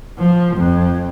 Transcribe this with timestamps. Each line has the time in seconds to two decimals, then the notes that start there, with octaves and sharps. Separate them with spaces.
0.19 F3
0.57 F2